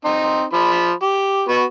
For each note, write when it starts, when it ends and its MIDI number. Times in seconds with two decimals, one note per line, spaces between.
0.05 0.44 60
0.05 0.44 63
0.53 0.92 53
0.53 0.92 83
1.02 1.42 67
1.48 1.63 59
1.48 1.63 66